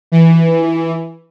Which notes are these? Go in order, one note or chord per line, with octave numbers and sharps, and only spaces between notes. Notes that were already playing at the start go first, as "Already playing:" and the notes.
E3